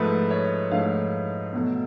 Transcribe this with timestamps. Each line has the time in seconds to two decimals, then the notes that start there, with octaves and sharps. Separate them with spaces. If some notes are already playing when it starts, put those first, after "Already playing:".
Already playing: G#2 F3 A3 B4
0.31 C#5
0.71 G#2 F3 A3 F5
1.53 B2 F#3 A3